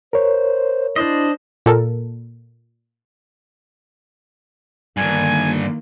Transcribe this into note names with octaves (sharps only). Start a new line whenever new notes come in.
A#4 C5 C#5
D4 E4 C5 D#5
A#2 A4 A#4
G2 D3 D#3 A#3 G#5